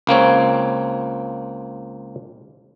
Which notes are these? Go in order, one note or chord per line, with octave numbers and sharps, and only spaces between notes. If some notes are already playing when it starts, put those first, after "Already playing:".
C#2 A#3 C4 C#5